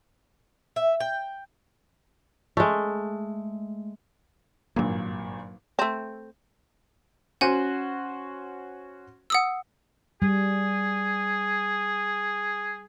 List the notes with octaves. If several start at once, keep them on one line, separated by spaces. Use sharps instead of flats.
E5
G5
G#3 A3
G#1 G2 A#2 F#3 A#3
A3 C4
C#4 F#4 C5 F#5 G#5
F#5 D#6 E6
G3 G#4